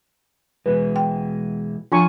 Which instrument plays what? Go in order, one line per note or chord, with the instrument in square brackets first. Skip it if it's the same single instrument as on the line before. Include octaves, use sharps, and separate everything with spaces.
[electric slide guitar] B2 E3 G#3 [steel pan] B4
[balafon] G5
[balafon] F3 D4 [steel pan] F4 G#5 C#6